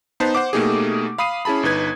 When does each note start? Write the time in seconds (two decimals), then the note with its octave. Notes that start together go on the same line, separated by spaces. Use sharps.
0.20 B3 D#4 B4 C5 A5
0.35 C5 F#5 D6
0.53 B2 A3 A#3 D#4 G4 G#4
1.18 F5 B5 D#6 C7 D#7
1.45 C#4 E4 G#4 A5 B5
1.63 G1 D#4 B4 G#6